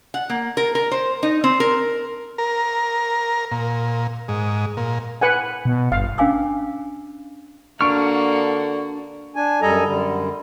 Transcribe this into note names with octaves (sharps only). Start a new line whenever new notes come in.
F#5
A#3
A#4
A#4
C5
D#4
C4
A#4
A#4
A#2
G#2
A#2
B4 F#5 G#5
B2
G1 F5
C#4 D4 F5 G#5 D6 E6
D3 A#3 D4 F#4 C#6 F6
D4 G#5
F#2 G3 A4 D#5 G#5 A#5
F#2 D3 G3